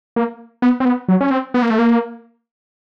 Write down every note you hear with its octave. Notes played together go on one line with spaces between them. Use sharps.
A#3
B3
C4
B3
F#3
C#4
C4
B3
A#3
A3
A#3